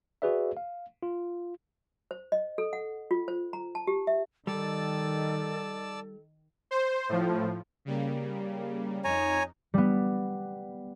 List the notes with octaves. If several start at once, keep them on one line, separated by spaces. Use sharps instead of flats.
F#4 G#4 B4 D5 E5
F5
F4
C5
D#5
A4
F#5
F4
C5
A#5
A5
G4
E5
D#3 G3 A4 D5 A5 E6
C5
A2 F3
C#3 G3 A#3
F2 D#4 C#5 G#5 A#5
G3 B3